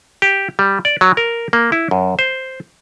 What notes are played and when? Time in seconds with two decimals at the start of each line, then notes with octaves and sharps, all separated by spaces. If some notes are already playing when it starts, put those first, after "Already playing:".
0.22 G4
0.59 G3
0.85 D5
1.01 F#3
1.17 A#4
1.53 A#3
1.72 E4
1.91 F#2
2.19 C5